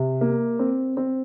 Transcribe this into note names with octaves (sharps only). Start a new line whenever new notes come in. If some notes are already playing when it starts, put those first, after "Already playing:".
Already playing: C3
A#3
C4
C4